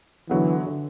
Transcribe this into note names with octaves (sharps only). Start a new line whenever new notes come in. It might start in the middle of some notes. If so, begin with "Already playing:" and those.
D3 E3 F#3 B3
D3